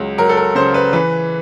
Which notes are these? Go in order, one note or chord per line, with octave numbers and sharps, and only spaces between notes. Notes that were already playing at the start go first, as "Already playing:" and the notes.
Already playing: C#2 F#3
F#3 A#4
A4
A#4
C#3 C5
B4
E3 B4